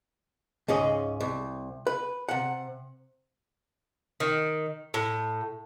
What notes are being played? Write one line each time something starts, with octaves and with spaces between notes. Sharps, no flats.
C#2 G#2 C#4 G#4 D#5
C2
B4
C3 F#5
D#3
A2